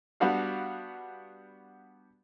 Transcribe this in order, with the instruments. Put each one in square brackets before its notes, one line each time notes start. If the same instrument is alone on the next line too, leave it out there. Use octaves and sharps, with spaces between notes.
[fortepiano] G3 B3 D4 F#4 F5